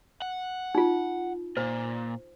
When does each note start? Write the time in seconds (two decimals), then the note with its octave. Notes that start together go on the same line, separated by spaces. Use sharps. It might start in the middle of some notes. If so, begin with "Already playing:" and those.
0.22 F#5
0.75 D#4 F4
1.57 A#2 C5